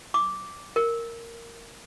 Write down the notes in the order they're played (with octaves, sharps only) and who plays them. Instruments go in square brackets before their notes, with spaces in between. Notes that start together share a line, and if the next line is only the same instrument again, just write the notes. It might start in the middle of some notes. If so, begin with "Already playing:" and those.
[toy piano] D6
A#4